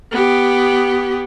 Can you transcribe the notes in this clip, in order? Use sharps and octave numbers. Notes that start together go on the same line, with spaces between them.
B3 G4